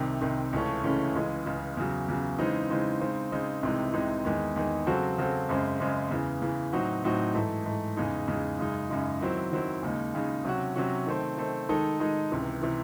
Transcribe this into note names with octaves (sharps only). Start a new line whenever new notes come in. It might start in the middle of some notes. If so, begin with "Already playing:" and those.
Already playing: C2 C3 D#3
C2 C3 D#3
C#2 C#3 E3 A3 C#4
C#2 C#3 E3 A3 C#4
C#2 C#3 E3 G#3
C#2 C#3 E3 G#3
E2 C#3 F#3
E2 C#3 F#3
C#3 E3 G#3 C4 D#4
C#3 E3 G#3 C4 D#4
C#3 G#3 C4 D#4
C#3 G#3 C4 D#4
C2 C3 E3 G#3 D#4
C2 C3 E3 G#3 D#4
E2 D#3 G#3
E2 D#3 G#3
C#3 F#3 C4 F#4 A4
C#3 F#3 C4 F#4 A4
F#2 C#3 G#3 C4
F#2 C#3 G#3 C4
E2 C#3 E3
E2 C#3 E3
A2 F#3 C4 D#4 F#4
A2 F#3 C4 D#4 F#4
G#2 E3 A3
G#2 E3 A3
E2 C#3 G#3 D#4
E2 C#3 G#3 D#4
F#2 C#3 G#3 D#4
F#2 C#3 G#3 D#4
D#3 F#3 C4 E4
D#3 F#3 C4 E4
D#2 C#3 G#3 D#4
D#2 C#3 G#3 D#4
C3 F#3 C#4 F#4
C3 F#3 C#4 F#4
D#3 A3 C4
D#3 A3 C4
D#3 G#3 D#4 A4
D#3 G#3 D#4 A4
C#2 C3 E3
C3 E3